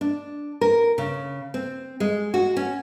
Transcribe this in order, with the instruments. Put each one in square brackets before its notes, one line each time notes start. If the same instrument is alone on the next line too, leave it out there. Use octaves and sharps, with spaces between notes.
[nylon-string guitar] D4
A#4
C#3
C4
G#3
F#4
C#4